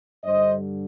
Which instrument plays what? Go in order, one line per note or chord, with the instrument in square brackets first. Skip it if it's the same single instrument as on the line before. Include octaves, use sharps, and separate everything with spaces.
[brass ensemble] G2 D3 G3 C5 D#5